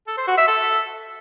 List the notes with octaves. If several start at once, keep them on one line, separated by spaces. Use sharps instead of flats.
A4
C5
F#4
E5
A4